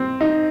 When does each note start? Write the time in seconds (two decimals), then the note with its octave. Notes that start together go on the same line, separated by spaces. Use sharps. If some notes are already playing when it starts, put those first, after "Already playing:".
Already playing: C4
0.21 D#4